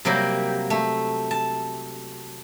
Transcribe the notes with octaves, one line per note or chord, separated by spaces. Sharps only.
C3 F#3 G3 A#3 G4
A3
A5